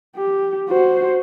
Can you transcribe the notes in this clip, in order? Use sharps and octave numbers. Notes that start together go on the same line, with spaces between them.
G4
F#4 C5